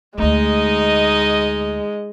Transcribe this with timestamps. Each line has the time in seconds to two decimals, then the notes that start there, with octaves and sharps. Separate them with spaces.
0.18 D2 G#3 A3 D#4 D#5